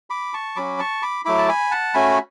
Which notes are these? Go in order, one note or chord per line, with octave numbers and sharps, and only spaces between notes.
B5 D6
A5 C#6
F#3 C#4 F#4 B5 D6
A5 C#6
B5 D6
F#3 A3 E4 B5 D6
A5
G#5 B5
F#5 A5
A3 C#4 F#4 G#5 B5